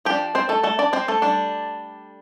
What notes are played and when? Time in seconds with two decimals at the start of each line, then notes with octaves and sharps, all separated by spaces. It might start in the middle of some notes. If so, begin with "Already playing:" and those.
0.05 F3 D4 G4 G5
0.35 C4 C5
0.49 A3 A4
0.64 A3 A4
0.79 D4 D5
0.93 C4 C5
1.08 A3 A4
1.22 G3 D4